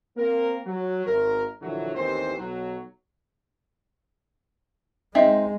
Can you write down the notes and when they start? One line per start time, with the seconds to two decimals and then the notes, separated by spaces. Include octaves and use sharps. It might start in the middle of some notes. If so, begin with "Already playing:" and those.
0.17 A#3 C4 A#4
0.66 F#3
1.06 G#1 A#4
1.61 A#1 D3 E3 F#3
1.96 A1 D#2 D#3 E3 C4 C5
2.38 B1 F#3
5.15 G#3 C4 D#4 E5